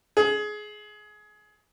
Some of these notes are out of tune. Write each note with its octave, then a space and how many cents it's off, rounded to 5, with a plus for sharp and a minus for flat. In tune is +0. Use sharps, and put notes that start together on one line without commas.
G#4 +20